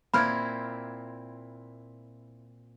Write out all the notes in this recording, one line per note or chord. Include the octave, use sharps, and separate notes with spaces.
A#2 A#3 C4 E4 B5 F6 G#6